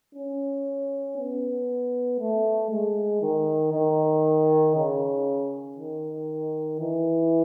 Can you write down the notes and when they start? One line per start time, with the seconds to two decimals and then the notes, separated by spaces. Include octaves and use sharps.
0.15 C#4
1.18 B3
2.19 A3
2.71 G#3
3.22 D#3
3.73 D#3
4.75 C#3
5.78 D#3
6.80 E3